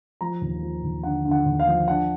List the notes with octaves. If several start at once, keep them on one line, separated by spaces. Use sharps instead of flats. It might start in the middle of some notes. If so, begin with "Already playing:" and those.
F3 A#5
D#2
F3
D#2
D3 F#5
D3
F#5
D#2
F5
F3
D4 F#5